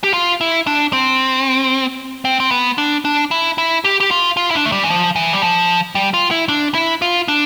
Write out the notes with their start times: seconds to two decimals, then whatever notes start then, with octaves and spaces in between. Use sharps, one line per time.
0.04 G4
0.14 F4
0.41 E4
0.67 D4
0.93 C4
2.25 C4
2.40 C4
2.51 B3
2.78 D4
3.05 D4
3.31 E4
3.58 E4
3.84 G4
4.00 G4
4.11 F4
4.37 F4
4.50 E4
4.55 D4
4.66 A3
4.72 G3
4.84 E3
4.90 F3
5.16 E3
5.33 G3
5.42 F3
5.95 G3
6.14 F4
6.31 E4
6.49 D4
6.75 E4
7.02 F4
7.28 D4